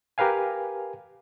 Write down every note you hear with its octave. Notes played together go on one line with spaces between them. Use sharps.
G4 A#4 B4 F5 G#5